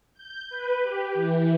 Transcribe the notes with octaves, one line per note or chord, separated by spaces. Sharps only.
G6
B4
G4
E3